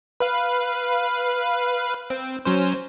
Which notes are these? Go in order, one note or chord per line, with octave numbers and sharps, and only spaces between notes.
B4 F5
C4
F#3 C#4 C5